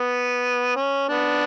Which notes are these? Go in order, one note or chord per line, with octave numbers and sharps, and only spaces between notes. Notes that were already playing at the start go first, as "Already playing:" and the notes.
Already playing: B3
C#4
B3 D4